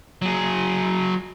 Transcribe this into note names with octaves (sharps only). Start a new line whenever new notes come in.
F#3 G#4